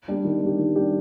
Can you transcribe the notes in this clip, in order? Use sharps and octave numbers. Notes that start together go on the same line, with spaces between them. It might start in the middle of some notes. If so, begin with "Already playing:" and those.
G3 D4 G4
D#3
G3 D4 G4
D#3
G3 D4 G4